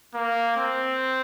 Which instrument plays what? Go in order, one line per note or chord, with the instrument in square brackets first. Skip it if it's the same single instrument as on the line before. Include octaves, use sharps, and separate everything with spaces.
[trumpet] A#3
C4